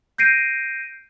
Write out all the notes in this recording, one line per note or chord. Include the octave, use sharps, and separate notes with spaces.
G6 A#6 C7 D7 D#7